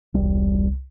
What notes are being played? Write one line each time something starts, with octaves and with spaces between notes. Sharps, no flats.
E1 C2 G3